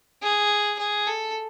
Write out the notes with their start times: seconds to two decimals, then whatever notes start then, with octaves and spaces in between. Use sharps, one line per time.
0.22 G#4
0.79 G#4
1.07 A4